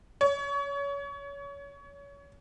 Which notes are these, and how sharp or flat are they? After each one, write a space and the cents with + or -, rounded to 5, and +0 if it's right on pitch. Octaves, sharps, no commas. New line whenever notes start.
C#5 +30